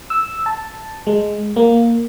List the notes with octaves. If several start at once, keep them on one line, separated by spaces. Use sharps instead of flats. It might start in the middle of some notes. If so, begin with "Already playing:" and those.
E6
A5
G#3
A#3